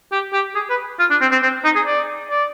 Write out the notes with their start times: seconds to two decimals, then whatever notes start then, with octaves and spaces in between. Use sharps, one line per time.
0.12 G4
0.33 G4
0.55 G#4
0.70 B4
0.99 F4
1.10 D4
1.21 C4
1.32 C4
1.43 C4
1.64 D#4
1.76 G#4
1.87 D5
2.31 D5